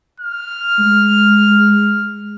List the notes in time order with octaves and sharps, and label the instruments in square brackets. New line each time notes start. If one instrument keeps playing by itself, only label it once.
[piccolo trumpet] F6
[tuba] G#3